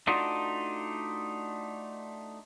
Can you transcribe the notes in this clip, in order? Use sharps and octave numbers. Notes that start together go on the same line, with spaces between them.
A3 D4 D#4 F4 F#4